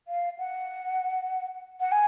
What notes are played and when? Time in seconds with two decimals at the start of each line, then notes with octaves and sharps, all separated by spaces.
0.08 F5
0.39 F#5
1.80 F#5
1.92 G#5